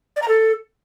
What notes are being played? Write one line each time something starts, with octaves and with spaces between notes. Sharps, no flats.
D5
A#5
A4